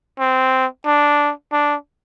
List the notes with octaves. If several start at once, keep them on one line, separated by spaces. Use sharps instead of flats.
C4
D4
D4